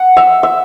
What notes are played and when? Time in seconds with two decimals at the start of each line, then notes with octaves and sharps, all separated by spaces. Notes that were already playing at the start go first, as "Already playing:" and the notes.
Already playing: F#5
0.17 E5
0.43 E5